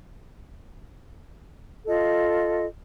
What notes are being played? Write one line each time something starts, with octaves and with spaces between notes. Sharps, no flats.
F4 A4 D#5